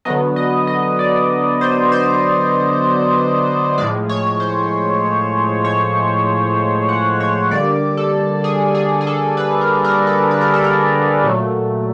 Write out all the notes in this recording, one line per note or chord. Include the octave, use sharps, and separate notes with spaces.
D3 F#3 B3 D#5
D#5
D#5
D5
C5
C5
A2 F3 G#3 D5
C#5
C5
C#5
F#5
C#5
D3 G3 A#3 D5
A4
G#4
G#4
G#4
A4
B4
A#4
A#4
A4
B4
A#4
A4
A#4
A#2 F#3 A3